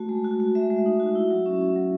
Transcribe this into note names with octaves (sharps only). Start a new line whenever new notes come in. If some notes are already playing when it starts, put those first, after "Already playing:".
Already playing: A3 F#4
G#3
F#4
F#4
G#3 E5
G#3
D#4
F#4
E4
F#3
C#4
C#4
F#3